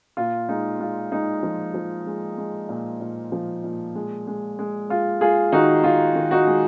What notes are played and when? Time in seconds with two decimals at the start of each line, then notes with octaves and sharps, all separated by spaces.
0.17 A#2 F4
0.49 G#3 D#4
0.80 G#3 F4
1.12 G#3 D#4
1.43 F3
1.74 F3
2.07 G#3
2.38 G#3
2.69 A#2
3.01 A#2
3.32 F3
3.64 A#2
3.95 G#3
4.27 G#3
4.59 G#3
4.90 G#3 F4
5.21 G#3 F4 G#4
5.52 D#3 D#4 F#4
5.84 D#3 F4
6.15 D#3
6.31 D#4 F#4
6.47 G#3